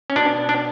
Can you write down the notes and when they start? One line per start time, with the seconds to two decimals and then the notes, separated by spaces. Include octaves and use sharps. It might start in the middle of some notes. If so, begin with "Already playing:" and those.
0.10 C#4
0.16 B2 D4
0.49 D4